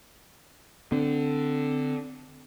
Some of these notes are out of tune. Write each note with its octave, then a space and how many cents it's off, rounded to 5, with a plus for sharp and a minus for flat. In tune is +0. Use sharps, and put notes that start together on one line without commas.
D3 +0 C4 -30